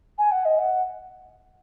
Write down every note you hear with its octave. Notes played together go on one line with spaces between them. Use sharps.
G#5
F#5
D#5
F#5